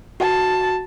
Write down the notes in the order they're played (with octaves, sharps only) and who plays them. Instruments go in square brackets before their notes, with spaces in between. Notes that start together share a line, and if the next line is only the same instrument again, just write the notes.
[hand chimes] F#4 [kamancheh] A5